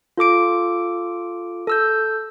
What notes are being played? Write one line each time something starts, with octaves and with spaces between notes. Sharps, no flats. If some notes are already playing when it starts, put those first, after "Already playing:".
F4 A4 D6 D7
A4 E6 G6